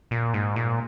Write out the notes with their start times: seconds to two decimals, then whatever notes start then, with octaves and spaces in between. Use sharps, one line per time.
0.11 A#2
0.34 G#2
0.56 A#2